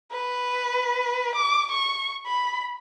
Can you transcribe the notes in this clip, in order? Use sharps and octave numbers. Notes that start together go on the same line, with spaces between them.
B4
D6
C#6
B5